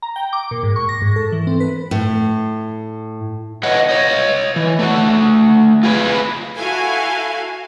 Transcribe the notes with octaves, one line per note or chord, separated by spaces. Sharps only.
A#5
G5
D6
A#2
G#2
C#6
A#6
G#2
A4
E3
C4
B4
A2
B4 C#5 D#5 E5 F#5
C#5 D#5
E3
A3 F#4
F4 G#4 B4
E4 F#4 A4 F5 G#5